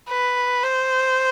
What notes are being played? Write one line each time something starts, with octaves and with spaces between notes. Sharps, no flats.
B4
C5